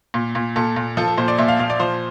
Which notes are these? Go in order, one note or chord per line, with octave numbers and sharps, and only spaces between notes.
A#2
A#2
A#2 A4
A#2
F3 A4
A4
A#2 C5
D5
A#2 E5
F5
A#2 F5
D5
F3 C5